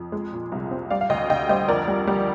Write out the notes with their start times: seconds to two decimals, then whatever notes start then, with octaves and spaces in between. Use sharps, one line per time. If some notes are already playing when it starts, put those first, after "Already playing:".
Already playing: F2
0.12 G#3
0.33 A#2
0.52 C2
0.71 C4
0.90 G3 D5 F5
1.01 F5
1.10 D2 D#5 G5
1.29 D2 D#5 G5
1.49 G3 C5 D#5
1.68 F2 A#4 D5
1.88 G3
2.07 G3